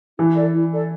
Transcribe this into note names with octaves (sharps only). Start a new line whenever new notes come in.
E3 E4
A4 D5
E4
A4 D5